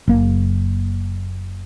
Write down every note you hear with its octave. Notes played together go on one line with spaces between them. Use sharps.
F#1 A#3